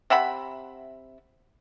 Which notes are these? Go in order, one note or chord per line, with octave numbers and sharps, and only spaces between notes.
C3 E5 F#5 B5